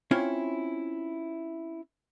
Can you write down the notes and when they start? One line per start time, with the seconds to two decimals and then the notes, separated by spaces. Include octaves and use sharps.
0.11 C4 C#4 E4 F4 C5 C#5